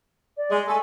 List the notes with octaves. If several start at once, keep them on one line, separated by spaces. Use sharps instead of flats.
D5
G#3
G#3 A3 A4 G#5